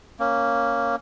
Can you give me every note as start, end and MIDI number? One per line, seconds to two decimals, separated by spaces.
0.20 0.96 58
0.20 0.96 61